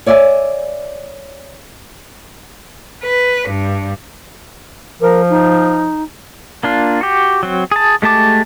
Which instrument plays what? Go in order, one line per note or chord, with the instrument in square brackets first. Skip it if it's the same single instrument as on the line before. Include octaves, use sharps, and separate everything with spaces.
[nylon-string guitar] C#5 D5 E5 F#5 G#5
[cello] B4
G2
[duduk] F3 [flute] A#4
[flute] D#4
[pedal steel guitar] A#3 D4 F4
F#4 G4
F#3 C4
G#4 A5
G#3 A3 G4 A5 D6